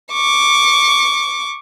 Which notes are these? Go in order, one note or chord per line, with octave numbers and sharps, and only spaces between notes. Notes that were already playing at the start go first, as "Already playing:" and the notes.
C#6 D6